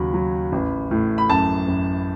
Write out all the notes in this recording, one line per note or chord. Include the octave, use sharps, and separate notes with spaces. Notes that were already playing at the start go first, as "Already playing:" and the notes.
Already playing: D#2 C#3 F#3 B5
F#3
A1
A2
B5
F#2 A5
F#2